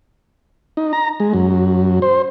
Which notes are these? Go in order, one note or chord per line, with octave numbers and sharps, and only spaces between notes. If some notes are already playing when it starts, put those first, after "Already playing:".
D#4
A#5
G#3
F#2
C5